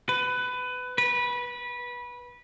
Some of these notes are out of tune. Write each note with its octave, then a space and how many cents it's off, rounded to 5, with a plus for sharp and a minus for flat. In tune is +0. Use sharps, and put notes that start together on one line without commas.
B4 +20
B4 -20